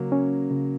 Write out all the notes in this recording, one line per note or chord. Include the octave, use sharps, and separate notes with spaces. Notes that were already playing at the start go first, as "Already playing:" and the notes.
Already playing: C#3 F#3 A#3
C#4
C#3